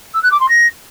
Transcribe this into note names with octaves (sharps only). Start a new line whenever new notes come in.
E6
F#6
D6
C6
A#6